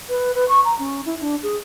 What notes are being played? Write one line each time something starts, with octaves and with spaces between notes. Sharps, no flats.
B4
B4
C#6
A#5
C#4
E4
D4
G#4